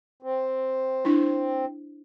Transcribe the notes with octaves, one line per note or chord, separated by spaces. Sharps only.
C4
D4 E4 C5